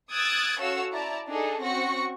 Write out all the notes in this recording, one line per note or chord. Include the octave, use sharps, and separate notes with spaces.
D#6 E6 F#6 G#6 A6 D7
C#4 F#4 A4 C#5 F5 E6
E4 D5 A5 A#5
D4 D#4 G#4 A4
C4 C#4 F#4 C#6 A#6 C#7